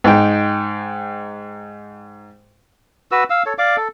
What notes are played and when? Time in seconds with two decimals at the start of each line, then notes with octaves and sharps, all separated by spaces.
0.04 G#2 D#4 G5
3.11 F#4 B4 E6
3.30 F5 E6
3.46 A4 C#5
3.58 D5 F5 D6
3.76 A4